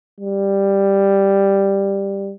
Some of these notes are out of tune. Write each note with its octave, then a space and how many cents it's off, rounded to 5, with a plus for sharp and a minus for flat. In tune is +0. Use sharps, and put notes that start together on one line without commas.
G3 +5